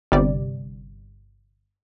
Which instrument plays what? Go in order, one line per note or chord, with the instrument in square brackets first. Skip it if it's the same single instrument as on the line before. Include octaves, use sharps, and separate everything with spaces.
[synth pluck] G1 C3 G3 D5